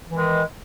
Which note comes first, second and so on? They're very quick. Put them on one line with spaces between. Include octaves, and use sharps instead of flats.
E3 D#3 G#3